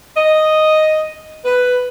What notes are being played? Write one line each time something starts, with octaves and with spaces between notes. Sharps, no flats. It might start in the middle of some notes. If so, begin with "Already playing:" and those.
D#5
B4